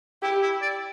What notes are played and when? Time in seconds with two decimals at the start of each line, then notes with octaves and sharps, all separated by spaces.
0.22 E4 G4
0.42 E4
0.62 D5